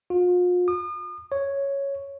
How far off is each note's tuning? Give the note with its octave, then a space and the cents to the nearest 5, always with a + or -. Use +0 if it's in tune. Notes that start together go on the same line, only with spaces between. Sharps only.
F4 +40
D#6 -40
C#5 +0